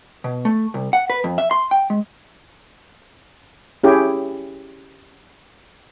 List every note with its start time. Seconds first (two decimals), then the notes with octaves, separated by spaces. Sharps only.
0.24 B2
0.45 A3
0.74 C2
0.93 F#5
1.10 B4
1.24 F2
1.38 E5
1.51 C6
1.71 G5
1.90 G#3
3.83 C#4 E4 G4 G#4